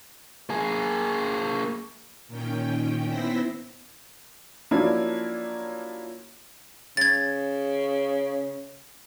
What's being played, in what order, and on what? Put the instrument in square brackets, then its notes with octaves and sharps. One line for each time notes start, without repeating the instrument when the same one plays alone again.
[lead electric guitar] A#3 G#4
[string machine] A#2 D#3 C#4 G5
B3 E4 C5 E6 A#6 B6
[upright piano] F3 F#3 A#3 C#4 D4 E4
[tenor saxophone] C#3 [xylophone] G#6 A6